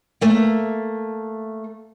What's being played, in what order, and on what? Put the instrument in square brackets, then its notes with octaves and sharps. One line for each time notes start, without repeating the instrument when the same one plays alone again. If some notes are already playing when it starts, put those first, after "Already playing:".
[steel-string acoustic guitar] A3 A#3